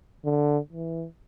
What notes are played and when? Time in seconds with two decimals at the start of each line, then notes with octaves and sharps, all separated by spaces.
0.25 D3
0.73 E3